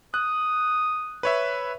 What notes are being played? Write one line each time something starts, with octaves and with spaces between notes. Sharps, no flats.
D#6 F#6
B4 C#5 E5